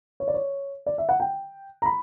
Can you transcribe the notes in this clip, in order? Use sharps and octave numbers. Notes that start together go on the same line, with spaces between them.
C#5
D5
C#5
D5
E5
F#5
G5
A#5
B5